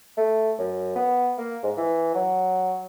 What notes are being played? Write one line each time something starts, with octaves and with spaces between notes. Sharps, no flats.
A3
F#2
B3
A#3
G#2
E3
F#3